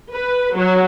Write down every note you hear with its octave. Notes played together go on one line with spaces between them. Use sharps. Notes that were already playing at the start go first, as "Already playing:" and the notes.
B4
F#3